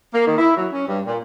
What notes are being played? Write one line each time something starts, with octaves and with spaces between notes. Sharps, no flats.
A#3
D#3
E4
F#3
C#4
G2
A#2